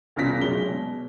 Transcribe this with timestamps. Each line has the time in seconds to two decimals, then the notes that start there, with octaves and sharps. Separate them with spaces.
0.16 E1 C2 C#3 F4 A#6 B6
0.41 F1 F#3 G#3 G7
0.68 B2